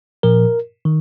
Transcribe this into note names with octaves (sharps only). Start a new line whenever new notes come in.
A#2 F3 A#4
D#3